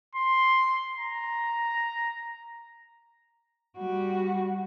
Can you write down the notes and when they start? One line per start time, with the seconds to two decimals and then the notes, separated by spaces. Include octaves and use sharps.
0.16 C6
0.98 A#5
3.78 G3 F#4